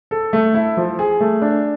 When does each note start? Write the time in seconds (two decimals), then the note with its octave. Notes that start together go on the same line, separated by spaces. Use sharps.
0.11 A4
0.33 A3
0.54 E4
0.77 F3
0.99 G#4
1.20 A3
1.42 D4